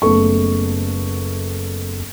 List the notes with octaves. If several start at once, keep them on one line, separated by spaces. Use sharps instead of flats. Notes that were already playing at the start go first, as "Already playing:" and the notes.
F#1 A3 B3 A4 C#6